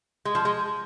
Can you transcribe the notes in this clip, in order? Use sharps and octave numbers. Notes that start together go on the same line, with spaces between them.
G#3
F3
G#3